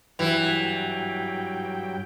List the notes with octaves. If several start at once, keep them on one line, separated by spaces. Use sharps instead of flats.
G2 E3 F#3 G5